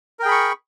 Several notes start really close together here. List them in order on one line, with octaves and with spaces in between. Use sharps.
A#4 G5 G#4 B5 C#6